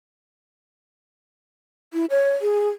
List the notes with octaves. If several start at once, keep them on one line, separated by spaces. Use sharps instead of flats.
E4
C#5
G#4